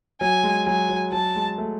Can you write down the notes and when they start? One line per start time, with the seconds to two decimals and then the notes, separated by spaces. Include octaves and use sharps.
0.21 F#3 G#5
0.43 G#3
0.66 F#3 G#5
0.89 F#3
1.12 F#3 A5
1.36 G#3
1.58 A3